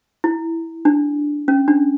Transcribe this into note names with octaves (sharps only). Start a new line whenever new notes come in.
E4
D4
C#4
D4